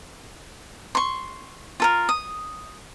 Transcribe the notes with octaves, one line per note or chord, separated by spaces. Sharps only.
C6 C#6
F4 A4 A#4
D#6